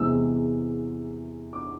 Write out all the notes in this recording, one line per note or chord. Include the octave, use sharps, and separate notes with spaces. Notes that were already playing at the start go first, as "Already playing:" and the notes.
Already playing: E2 C3 E3 G#3 B3 E6
D6